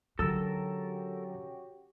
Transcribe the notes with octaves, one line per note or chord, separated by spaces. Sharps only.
D3 F#3 C#4 F#4 G4 A4 A#4 E6